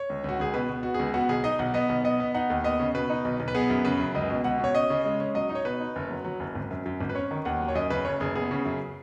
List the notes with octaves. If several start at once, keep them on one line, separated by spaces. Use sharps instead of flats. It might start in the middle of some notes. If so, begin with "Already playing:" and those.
Already playing: C#5
C#2
C#2 F#4
C#2 G#4
B2 B4
B2
B3 F#4
C#2 G#4
B3 F#4
B1 G#4
D#4 D#5
B1 F#5
B3 D#5
B1
B3 D#5
B3
D#4 F#5
D#2
B3 D#5
C#3
B2 B4
D#4
B1
B1
B4
B3 G#4
F#2
C#3 B4
F#2
C#2 D#5
B2
C#2 F#5
B2 C#5
C#4 D#5
C#3
G#3
C#4
F#3 D#5
D#4
C#5
B2 B4
D#4
F#1
F#3
F#3
F#1
G#1
F#2
F#2
G#1
B4
C#4 C#5
D#3
D#2 F#5
F#3
C#5
F#2 D#5
C#3 B4
F#1 C#5
F#1 G#4
B3 G#4
C#3
F#2